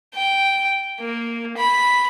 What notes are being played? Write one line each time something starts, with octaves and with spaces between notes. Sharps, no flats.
G5
A#3
B5